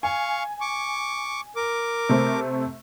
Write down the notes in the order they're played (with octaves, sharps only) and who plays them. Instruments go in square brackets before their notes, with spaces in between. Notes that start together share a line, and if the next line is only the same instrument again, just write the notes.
[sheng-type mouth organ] F5 C#6 [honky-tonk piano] G#5
[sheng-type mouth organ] C#6 D6
A#4 D6
[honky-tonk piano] C3 A3 C4